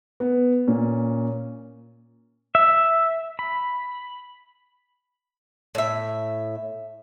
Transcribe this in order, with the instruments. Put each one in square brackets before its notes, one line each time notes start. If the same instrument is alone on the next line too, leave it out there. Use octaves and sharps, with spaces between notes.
[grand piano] B3
A#2 C#4
[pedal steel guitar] E5
B5
[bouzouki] A2 E5